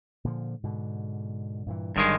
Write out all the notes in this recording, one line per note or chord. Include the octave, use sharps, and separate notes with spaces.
A#2 D3 F3
G#2 B2 D3
G2 A#2 E3
G1 G2 D#3 F#3 G#3